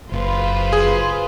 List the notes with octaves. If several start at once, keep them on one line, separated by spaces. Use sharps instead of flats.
F#1 F4 B4 C5
G#4